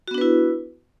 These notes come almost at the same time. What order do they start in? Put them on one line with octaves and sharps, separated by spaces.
F#4 B3 D4 B4 E4